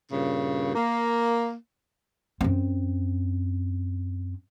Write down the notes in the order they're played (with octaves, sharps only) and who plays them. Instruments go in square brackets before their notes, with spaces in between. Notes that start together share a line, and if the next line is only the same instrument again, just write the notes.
[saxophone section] G2 A#2 C#3
A#3
[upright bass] F#2 C4